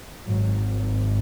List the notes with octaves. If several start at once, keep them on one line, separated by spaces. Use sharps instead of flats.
G#1 G#2 F#3